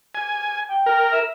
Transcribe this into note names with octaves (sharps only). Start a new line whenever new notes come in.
G#5
G5
A#4
E5